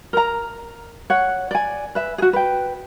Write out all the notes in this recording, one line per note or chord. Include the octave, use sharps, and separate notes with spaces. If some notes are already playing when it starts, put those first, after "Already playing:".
A#4 A#5
C#5 F#5
D5 G#5
B4 E5
F#4 G#4
B4 G5